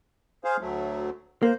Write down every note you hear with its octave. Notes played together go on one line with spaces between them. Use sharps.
G#4 C5 F5
D2 F#3 A3
A#3 C5